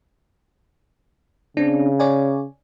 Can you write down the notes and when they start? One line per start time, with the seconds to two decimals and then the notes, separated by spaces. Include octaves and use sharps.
1.57 C#3 C4 D4
1.99 C#5 D5 G#5